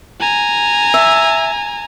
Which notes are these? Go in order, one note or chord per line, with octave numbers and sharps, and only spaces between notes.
G#5 A#5
E5